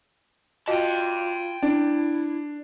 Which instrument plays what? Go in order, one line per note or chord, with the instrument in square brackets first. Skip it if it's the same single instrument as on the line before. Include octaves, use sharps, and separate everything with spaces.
[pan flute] F4 [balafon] F#4 D#5 [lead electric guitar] G5 A5
[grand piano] D4 [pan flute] E4